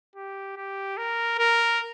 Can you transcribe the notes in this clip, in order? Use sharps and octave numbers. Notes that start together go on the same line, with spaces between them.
G4
G4
A#4
A#4